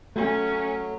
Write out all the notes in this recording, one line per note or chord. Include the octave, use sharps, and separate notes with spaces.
F#3 A3 C#4